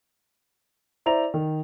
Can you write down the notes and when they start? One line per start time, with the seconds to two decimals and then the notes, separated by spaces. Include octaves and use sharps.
1.06 E4 C5 D5 A#5 F7
1.34 D#3